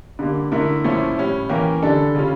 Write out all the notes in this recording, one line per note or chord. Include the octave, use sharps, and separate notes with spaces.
D3 G3 A#3
D3 A3 E4 A#4
A#2 F3 A3 C#4 E4
A2 G3 C#4
E3 A#3 C#4 G4 A#4
D3 G3 D4 A4
C#3 G3 C#4 F4